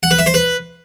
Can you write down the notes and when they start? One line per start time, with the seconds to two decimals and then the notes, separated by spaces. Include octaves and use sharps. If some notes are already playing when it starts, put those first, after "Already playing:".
0.03 F#5
0.11 B4
0.19 E5
0.26 C5
0.34 B4